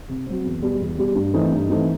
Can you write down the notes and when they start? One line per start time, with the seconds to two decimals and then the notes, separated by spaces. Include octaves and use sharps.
0.09 C3
0.26 F#3 C4
0.44 E2
0.62 B2 G3
0.80 E2
0.97 B2 G3
1.15 G2
1.34 E3 A3 C4 D#4
1.52 G2
1.69 E3 A3 C4 D#4